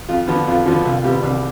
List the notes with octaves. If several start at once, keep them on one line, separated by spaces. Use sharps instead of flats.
F2 F4
D3 F3 B3
F2 F4
D3 F3 B3
C2 F4
F4
C3 G3 B3 G4
C2 D4